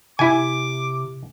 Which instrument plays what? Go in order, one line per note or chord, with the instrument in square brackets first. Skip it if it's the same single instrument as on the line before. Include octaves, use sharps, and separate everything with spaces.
[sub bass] C3 [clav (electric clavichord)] E4 G#5 [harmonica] D6